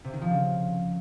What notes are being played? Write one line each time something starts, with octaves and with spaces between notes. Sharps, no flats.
C3
D#3
F3
C#3